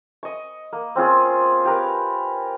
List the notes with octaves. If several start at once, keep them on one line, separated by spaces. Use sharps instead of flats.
D#5 C#6
A#3
C4 C#4 F4 G#4
G4 A#4 B4